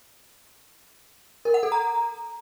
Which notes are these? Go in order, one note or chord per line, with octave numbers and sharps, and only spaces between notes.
A#4
F#5
A4
A#5